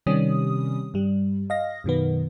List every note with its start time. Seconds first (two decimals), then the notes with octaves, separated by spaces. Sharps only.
0.06 C3 D#3 G3 C#4 D#6
0.94 G2 G3
1.50 D#5 F5 A#6
1.84 F#2 B2 D#3 B3